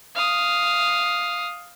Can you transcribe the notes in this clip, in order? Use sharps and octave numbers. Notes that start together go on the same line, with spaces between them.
F5 D#6